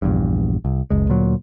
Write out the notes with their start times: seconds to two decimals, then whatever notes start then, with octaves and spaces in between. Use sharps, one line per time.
0.02 A#1 E2 G2
0.65 C2
0.90 F#1 C#2 G#3
1.09 D2 A#2 F#3